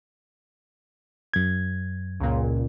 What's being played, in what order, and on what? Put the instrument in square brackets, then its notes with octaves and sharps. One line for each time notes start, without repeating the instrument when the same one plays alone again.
[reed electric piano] F#2 G#6
[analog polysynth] C#2 A#2